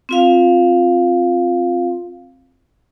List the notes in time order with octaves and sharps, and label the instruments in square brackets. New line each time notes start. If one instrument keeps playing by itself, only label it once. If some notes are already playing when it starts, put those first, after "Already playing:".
[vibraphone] C4 F4 F5